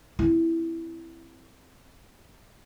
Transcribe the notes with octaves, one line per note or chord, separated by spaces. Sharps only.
C4 E4